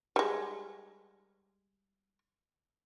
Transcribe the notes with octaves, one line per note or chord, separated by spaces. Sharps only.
G3 G#3